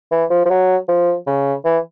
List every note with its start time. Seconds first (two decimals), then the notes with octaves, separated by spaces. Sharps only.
0.11 E3
0.30 F3
0.45 F3
0.50 F#3
0.88 F3
1.27 C#3
1.65 E3